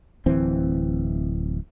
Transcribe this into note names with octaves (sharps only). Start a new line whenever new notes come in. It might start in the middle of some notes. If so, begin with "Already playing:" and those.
D1 E3 C4